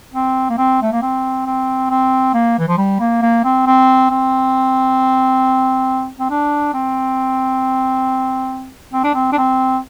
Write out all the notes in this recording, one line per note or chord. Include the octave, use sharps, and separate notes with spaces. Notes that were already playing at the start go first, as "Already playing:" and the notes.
C4
A#3
C4
A3
A#3
C4
C4
C4
A#3
E3
F3
G3
A#3
A#3
C4
C4
C4
C4
D4
C4
C4
D4
C4
D4
C4